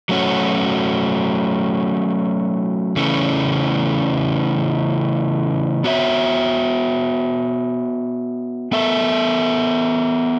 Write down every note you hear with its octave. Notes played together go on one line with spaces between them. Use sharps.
F#3 A3 C#4 F#4
C#3 E3 A3 C#4
B3 F#4 C#5 E5
B3 A4 E5